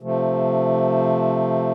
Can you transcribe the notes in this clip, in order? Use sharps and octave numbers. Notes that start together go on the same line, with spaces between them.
C3 F3 A3